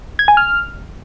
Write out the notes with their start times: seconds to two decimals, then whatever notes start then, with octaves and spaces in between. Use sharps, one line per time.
0.19 G#6
0.28 G#5
0.37 F6